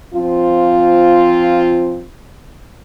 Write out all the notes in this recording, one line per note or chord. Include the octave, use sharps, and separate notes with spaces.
F3 C4 F4